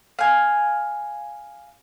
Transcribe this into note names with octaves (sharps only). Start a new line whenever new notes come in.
F5 G#5